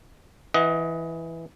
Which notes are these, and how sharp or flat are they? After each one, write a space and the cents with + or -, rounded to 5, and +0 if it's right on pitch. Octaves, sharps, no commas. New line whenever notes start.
E3 +0 D#5 +25 F#5 +0